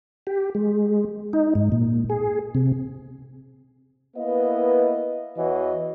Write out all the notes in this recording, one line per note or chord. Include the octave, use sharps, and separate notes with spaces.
G4
G#3
D#4
G#2
A#2
G#4
C3
A#3 B3 E4 B4 D#5 F5
E2 E3 F#4 C#5 D#5 F#5